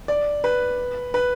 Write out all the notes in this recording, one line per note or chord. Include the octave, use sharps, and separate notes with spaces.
D5
B4
B4